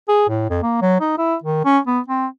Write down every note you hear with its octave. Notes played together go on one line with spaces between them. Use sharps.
G#4
A2
F2
A#3
F#3
D#4
E4
D#3
C#4
B3
C4